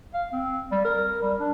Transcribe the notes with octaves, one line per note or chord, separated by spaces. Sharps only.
F5
C4
G3
A#4
G3
D4